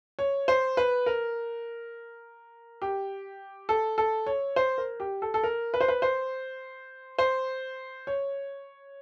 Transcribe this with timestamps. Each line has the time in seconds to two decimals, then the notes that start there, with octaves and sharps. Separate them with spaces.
0.19 C#5
0.48 C5
0.77 B4
1.06 A#4
2.82 G4
3.69 A4
3.98 A4
4.26 C#5
4.56 C5
4.78 A#4
5.00 G4
5.22 A4
5.34 A4
5.44 A#4
5.74 B4
5.81 C5
5.88 B4
6.02 C5
7.19 C5
8.07 C#5